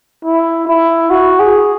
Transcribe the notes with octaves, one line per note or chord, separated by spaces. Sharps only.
E4
E4
F#4
G#4